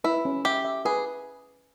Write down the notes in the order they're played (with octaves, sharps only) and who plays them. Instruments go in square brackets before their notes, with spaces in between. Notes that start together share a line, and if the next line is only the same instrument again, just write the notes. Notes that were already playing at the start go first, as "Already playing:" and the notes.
[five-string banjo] E4 [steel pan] B4
[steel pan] C#4
[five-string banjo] G4 [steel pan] E5
[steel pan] E5
[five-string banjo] G#4 [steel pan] B4